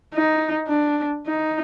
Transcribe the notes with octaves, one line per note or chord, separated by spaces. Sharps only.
D#4
D4
D#4